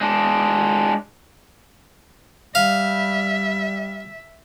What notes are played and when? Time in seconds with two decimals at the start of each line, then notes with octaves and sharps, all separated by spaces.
0.01 G#3 D4
2.55 G3 E5 F5